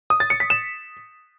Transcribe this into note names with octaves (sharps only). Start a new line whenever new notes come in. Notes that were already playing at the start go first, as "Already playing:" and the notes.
D#6
A6
C#7
B6
E7